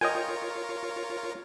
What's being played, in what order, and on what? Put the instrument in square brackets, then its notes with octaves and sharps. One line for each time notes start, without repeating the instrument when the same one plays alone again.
[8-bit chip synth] F4 A#4 C#5 [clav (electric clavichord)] D#5 G5 G#5